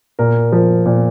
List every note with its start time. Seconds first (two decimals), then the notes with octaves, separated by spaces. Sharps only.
0.19 A#2 A#4
0.52 F3
0.86 A#2